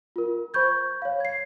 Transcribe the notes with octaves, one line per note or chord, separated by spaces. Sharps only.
F4 A#4
C5 B5 C#6 G6 G#6
C#5 F5
G#6 C7